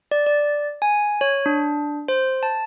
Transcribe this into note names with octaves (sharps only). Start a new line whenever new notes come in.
D5
D5
G#5
C#5
D4
C5
A5